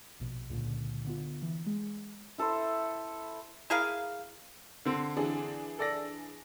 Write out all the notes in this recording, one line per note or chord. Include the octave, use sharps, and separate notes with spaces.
A#1 B2
C#2 A#2 D3
D3 B3 F4
E3
G#3
E4 A4 B4 C5
E4 G#4 A#4 F5
D3 C4
E3 D4 G#4
A4 D5 A#6